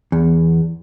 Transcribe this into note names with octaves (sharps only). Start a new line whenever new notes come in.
E2